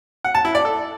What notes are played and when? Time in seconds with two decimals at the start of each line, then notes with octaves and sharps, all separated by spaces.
0.24 F#5
0.35 A5
0.45 E4
0.55 D5
0.65 A4